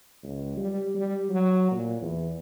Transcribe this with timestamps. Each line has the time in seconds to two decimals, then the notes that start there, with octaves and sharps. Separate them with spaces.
0.23 C#2
0.57 G3
0.95 G3
1.30 F#3
1.71 A#2
2.02 E2